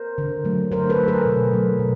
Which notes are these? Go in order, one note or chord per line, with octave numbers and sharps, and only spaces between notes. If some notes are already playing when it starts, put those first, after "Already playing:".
Already playing: A#4 C5
D3
F#3 A3
D3 A#4 C5
A4 B4
F#3 A3
G#4 A#4
B2
F#3 A3
B2